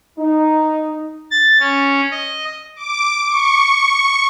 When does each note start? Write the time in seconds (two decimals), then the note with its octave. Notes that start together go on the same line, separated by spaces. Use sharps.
0.18 D#4
1.31 A6
1.60 C#4
2.11 D#5
2.76 D6
3.28 C#6